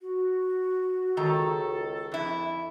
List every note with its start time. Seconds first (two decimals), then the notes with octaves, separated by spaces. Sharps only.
0.02 F#4
1.17 C#2 D#3 A4 A#5
2.12 F2 E4